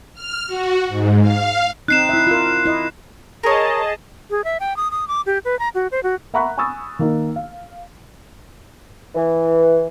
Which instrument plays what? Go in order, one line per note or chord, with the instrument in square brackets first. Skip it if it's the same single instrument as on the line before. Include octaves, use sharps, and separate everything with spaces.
[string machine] F6
F#4
G#2
F5
[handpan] C4 D#4 [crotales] F#6 C7 E7
[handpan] E4 E5
F4 A#4
E4 D#5
[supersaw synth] G#4 D#5 A5 [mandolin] A#4 C#5
[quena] G#4
E5
G5
D#6
D#6
D6
G4
B4
A#5
F#4
C5
F#4
[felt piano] E5 F#5 A#5 B5 C#6 F#6
G#5 B5 C#6 D#6 E6 A6
D#3 A#3 D#4
F5
[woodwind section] E3